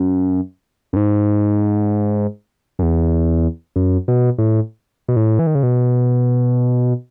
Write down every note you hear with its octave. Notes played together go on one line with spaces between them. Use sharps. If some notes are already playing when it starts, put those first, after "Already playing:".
Already playing: F#2
F#2
G#2
F#2
E2
F#2
B2
A2
B2
A2
E3
D#3
C#3
B2